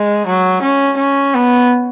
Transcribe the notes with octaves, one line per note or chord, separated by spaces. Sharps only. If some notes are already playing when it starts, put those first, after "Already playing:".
Already playing: G#3
F#3
C#4
C#4
B3